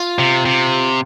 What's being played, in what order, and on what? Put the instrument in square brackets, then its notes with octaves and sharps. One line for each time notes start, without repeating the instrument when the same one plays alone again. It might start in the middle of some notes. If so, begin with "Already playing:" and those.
Already playing: [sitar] F4
[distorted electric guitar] C3
C3